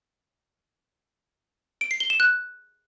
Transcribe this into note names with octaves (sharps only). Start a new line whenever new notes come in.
D7
C7
G7
E7
F#6